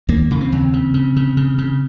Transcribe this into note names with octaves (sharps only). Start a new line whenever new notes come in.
D#2 A#3
C#3
C4
D#2
C#3
C#3
C#3
C#3
C#3